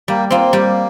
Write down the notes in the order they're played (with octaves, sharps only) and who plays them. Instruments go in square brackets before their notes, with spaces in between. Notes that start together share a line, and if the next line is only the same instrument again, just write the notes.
[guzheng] G3 [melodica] A#3
[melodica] A#3 [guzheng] C4 F4
[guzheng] G3